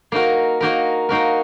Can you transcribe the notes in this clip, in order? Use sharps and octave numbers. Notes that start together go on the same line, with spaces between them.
A#3 D#4 F#4 A#4
A#3 D#4 F#4 A#4
A#3 D#4 F#4 A#4